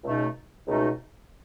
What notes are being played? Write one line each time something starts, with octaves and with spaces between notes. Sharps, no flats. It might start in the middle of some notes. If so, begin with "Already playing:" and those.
C#2 B2 A3 D#4
C#2 B2 A3 D#4